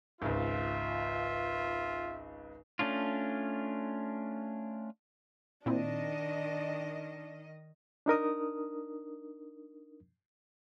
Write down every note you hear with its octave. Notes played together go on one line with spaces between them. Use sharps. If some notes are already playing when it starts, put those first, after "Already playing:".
G#1 C#2 F4 E5
A3 C#4 D4 F4
A#2 D#3 C4 D4 E4 D#5
D4 D#4 A#4 D#6